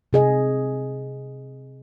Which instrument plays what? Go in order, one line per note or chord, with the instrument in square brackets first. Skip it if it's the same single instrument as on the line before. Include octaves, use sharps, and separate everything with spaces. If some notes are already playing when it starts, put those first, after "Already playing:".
[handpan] C3 G#4 D#5